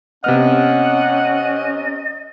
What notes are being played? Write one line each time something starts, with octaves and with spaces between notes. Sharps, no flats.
C3 B3 C#4 D#5 F#5 F6